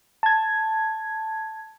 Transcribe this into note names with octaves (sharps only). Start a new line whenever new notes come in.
A5 G#6